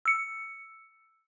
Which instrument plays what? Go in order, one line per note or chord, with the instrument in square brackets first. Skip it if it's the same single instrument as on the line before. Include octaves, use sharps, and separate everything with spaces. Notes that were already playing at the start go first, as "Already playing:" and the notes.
[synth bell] E6 C#7